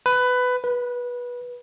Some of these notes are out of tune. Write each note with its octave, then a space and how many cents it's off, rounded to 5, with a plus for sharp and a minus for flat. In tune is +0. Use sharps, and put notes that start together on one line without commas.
B4 +15
B4 -20